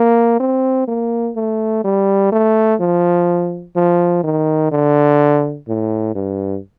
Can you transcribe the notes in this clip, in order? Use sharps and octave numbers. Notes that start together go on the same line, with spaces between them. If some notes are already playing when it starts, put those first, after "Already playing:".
Already playing: A#3
C4
A#3
A3
G3
A3
F3
F3
D#3
D3
A2
G2